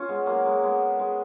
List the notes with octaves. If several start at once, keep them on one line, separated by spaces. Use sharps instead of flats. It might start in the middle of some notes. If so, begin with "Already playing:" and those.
Already playing: C#4 F4
G#3 B3
F#3 A#3
G#3
G#3 B3
G#3